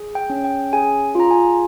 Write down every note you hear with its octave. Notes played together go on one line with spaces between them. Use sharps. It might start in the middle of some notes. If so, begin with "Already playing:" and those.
Already playing: G#4
G5
C#4
G5
G#4 G#5
F4 A#5
G#5